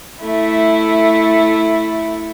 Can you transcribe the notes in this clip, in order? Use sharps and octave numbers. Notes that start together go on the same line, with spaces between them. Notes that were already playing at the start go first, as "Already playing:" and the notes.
A3 E4